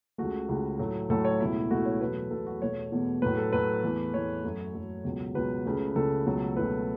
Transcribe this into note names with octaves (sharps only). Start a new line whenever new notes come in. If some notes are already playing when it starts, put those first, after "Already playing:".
C#2 C#3 A3 F#4
C#2 C#3 A3
A2 F#3 A3
A2 F#3 A3 A4
C#5
C#2 B2 A3 E4
C#2 B2 A3 F#4
C#5
E2 B2 F#3 A3 B4
E2 B2 F#3 A3 A4
F#4
E2 B2 A3 C#5
E2 B2 A3
A2 F#3 A3 B4
A4
A2 F#3 A3 B4
E2 E3 A3
E2 E3 A3 C#5
F#2 F#3 A3
F#2 F#3 A3 A4
C#2 B2 F#3
C#2 B2 F#3 B4
C#2 C#3 A3
C#2 C#3 A3 A4
C#2 B2 F#3 A3
C#2 B2 F#3 A3 B4